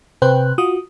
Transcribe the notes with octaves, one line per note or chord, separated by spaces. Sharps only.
C3 B4 C5 G5 F#6
F4 F#4 D#6